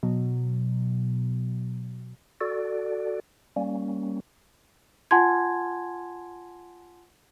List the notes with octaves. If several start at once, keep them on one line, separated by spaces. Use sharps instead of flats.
B2 F#3
F#4 A4 D5
G3 A#3 C#4
F4 F#5 G#5 A5 C6 G#6